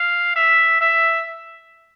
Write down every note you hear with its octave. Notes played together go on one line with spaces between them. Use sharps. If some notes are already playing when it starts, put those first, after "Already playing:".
Already playing: F5
E5
E5